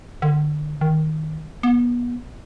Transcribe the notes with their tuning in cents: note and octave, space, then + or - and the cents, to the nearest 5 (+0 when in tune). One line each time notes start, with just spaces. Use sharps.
D3 +35
D#3 +5
B3 -30